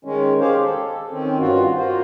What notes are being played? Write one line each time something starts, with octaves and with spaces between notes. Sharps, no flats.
D#3 G#3 C#4
G4 G#4 C5 C#5 F5
A4
D#3 C4 C#4
G2 F4 F#4
A#3 F4 F#4 C5